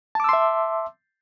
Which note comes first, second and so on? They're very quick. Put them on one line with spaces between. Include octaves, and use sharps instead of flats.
A5 D6 E6 C6 E5